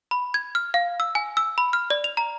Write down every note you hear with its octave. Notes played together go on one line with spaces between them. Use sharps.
B5
G#6
F6
F5
E6
G#5
E6
B5
F6
D5
F7
A#5